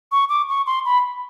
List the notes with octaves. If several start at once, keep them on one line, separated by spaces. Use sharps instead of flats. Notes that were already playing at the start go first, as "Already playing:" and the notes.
C#6
D6
C#6
C6
B5